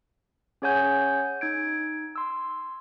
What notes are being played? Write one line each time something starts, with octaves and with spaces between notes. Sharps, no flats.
C#4 G#4 C#5 F#5 G#5 G6
D#4 G#6 D7
C6 E6